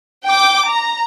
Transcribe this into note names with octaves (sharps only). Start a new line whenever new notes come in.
G5 D6
A#5